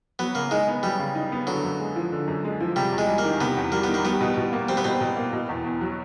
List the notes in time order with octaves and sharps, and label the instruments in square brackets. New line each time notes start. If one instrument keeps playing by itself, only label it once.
[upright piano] F#3 [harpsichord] B3
[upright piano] C#3 [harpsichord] A#3
[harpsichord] G#3 [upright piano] D#4
[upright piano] B3
[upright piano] F#3 [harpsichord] G3
[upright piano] C#3
D#4
B3
[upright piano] D3 [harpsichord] F#3
[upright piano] F#2
G#3
F3
D3
F#2
G#3
F3
[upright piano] C3 [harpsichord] G3
[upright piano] E2
[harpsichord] G#3
[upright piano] G3
[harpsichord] A#3
[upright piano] D#3
[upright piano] C3 [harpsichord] B3
[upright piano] E2
[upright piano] G3 [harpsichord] A#3
[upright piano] D#3 [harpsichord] B3
[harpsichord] A#3
[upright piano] G3 [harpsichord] B3
[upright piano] B2
B2
A#3
[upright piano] G3 [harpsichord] C4
[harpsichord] B3
[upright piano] B2 [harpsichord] C4
[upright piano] B2
A#3
B2
E2
E2
F#3